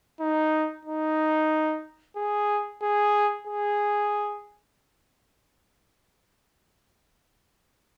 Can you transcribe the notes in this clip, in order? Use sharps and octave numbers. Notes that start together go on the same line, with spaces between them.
D#4
D#4
G#4
G#4
G#4